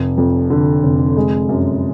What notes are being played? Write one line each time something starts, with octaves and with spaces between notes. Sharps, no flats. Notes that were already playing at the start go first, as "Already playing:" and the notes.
Already playing: F1
F2
D3
F1
G#3
F#2